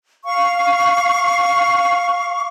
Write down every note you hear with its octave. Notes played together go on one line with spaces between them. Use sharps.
F5 C#6